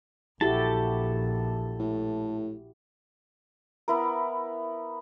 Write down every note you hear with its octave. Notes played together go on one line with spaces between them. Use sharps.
A#1 E4 F#4 G4 A4 A5
A2
B3 E4 A#4